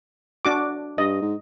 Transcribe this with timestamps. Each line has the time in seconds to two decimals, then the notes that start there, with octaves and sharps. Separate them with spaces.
0.45 D4 F#4 D6
0.98 G2 D#5
1.22 G#2